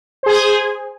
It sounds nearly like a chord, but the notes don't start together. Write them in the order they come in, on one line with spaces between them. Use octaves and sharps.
C5 G#4 G#5